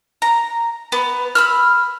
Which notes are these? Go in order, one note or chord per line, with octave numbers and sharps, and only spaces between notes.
A#5
B3
B5 E6 F6